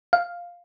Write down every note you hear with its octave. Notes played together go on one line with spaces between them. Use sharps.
F5